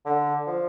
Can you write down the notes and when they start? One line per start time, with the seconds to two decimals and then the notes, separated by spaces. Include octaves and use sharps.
0.06 D3
0.47 F3